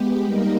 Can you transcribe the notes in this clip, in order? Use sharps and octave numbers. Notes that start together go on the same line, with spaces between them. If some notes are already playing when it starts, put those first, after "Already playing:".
Already playing: G#3 B3 G4
G3 A#3 D#4 A#4